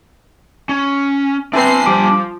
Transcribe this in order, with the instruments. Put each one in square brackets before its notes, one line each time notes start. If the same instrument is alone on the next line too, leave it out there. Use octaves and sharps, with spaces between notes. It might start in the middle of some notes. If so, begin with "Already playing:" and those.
[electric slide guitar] C#4
[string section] C4 C7 [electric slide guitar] D4 G#5 [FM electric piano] B4 E5
[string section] F3 [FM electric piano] G3 D6